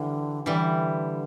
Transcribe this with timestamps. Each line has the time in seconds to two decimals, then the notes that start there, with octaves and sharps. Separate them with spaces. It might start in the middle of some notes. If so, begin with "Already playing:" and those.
Already playing: D3 E3 G3
0.46 D3 E3 G3